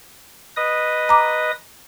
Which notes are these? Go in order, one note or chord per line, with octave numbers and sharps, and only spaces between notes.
B4 D#5 D#6
A#5 D6